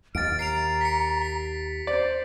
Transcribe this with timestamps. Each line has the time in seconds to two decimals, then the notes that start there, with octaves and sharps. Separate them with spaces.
0.15 D#2 F6 A6 D7
0.39 A#5 C7 D7 F7
0.81 B6 C#7
1.22 B6
1.87 C5 D5